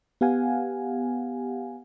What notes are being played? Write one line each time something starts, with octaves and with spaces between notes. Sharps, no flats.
B3 G4 F5 F#5 G#5